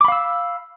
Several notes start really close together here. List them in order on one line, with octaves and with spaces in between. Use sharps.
D6 B5 F5 E6